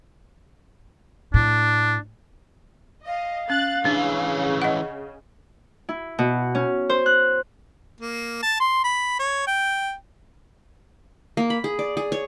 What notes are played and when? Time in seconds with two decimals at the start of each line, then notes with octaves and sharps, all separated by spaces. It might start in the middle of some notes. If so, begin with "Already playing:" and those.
1.34 A2 D4
3.06 D#5 F5
3.50 C#4 F#6 A6
3.85 C#3 E3 C#4 D4
4.62 D#5 F#5
5.89 E4
6.19 B2
6.55 C#4
6.90 C5
7.06 F#6
8.01 A#3
8.43 A5
8.60 C6
8.84 B5
9.19 C#5
9.47 G5
11.37 A#3
11.50 B5
11.64 G#4
11.79 D5
11.97 G#4
12.12 C#5